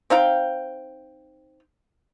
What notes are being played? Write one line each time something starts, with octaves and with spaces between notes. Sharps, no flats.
C4 D#4 F5 G5